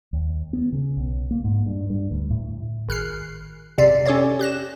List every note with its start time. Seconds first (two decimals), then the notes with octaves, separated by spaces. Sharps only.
0.13 D#2
0.53 B3
0.72 C#3
0.97 B1
1.31 A#3
1.44 G#2
1.66 G2
1.90 G2
2.11 D2
2.30 A2
2.89 G#1 F6 F#6 C7
3.78 G#1 F2 C3 D5 E5 C7
4.06 C#4 G4 A4 C#5 D5
4.39 G4 F#6 A#6 E7